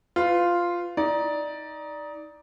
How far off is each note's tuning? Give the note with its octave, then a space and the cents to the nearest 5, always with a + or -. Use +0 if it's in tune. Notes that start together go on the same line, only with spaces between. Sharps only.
F4 +0 B4 +30
D#4 +15 D5 +0